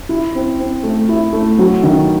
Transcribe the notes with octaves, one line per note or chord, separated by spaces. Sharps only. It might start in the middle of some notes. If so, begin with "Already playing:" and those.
E4
C4
C4
A3
E4
A3
F#3
D#3